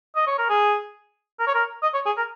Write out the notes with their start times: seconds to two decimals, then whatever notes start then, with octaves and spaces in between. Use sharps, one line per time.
0.16 D#5
0.27 C#5
0.38 A#4
0.49 G#4
1.39 A#4
1.47 C#5
1.54 A#4
1.83 D#5
1.94 C#5
2.06 G#4
2.17 A#4